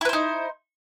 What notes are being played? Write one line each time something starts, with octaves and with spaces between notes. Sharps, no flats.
D#4 E4 B4 C5